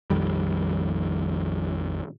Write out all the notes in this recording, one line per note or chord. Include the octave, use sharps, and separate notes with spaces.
A#1 F2 D#3 G3